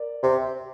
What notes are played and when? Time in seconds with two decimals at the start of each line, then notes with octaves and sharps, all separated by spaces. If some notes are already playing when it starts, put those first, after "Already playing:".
Already playing: A#4 D5
0.23 C3 C5